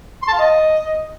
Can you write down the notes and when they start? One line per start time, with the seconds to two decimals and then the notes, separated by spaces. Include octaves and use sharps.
0.23 C6
0.28 A5
0.33 F5
0.39 D#5